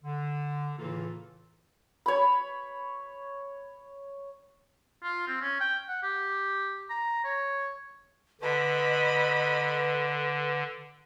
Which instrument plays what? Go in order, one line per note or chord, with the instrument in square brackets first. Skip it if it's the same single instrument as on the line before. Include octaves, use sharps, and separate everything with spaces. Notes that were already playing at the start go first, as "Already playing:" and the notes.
[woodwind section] D3
A2 C#3 E3 A#3 F4 A4
[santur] C#5 B5
[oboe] F4
C4
C#4
G5
F#5
G4
A#5
C#5
[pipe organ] D3 [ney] B4 [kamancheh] D#5 B5